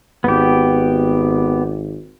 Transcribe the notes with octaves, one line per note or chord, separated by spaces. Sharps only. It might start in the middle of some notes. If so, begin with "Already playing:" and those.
G#1 B3 G4